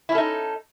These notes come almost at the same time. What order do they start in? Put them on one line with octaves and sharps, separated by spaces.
E4 C#4 A4 D#4